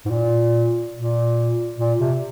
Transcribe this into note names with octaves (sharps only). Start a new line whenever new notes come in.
G#2
A#2
A#2
A#2
C3